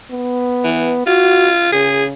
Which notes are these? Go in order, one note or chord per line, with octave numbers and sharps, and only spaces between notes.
B3
E3
F4 F#4
C#3 G#4